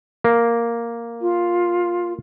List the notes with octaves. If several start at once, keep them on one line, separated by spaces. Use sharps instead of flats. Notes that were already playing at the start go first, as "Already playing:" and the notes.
A#3
F4